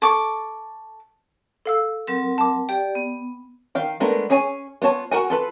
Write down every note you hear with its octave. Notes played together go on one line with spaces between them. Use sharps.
A4 C#6 D6
A4 F5 E6
F#3 C4 A#4
A5 D6
G4 D5 G5
B3
D#3 F5 G5
G#3 A3 B3 D4 A#4
C#4 G#4 C#5 G#5
B3 F4 C#5 A5
F#4 A#4 F#5 G#5
F4 A4 B4